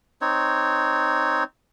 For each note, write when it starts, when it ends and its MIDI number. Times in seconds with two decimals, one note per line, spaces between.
0.21 1.44 60
0.21 1.44 63
0.21 1.44 73